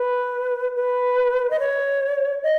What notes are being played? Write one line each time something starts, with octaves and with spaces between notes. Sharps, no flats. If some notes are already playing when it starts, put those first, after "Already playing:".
Already playing: B4
B4
D#5
C#5
D#5